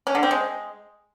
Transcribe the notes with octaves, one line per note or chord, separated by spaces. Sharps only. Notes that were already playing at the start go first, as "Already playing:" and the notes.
C#4
D3
C4
G#3